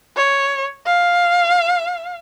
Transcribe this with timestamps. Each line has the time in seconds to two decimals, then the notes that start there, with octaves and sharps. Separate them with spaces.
0.17 C#5
0.86 F5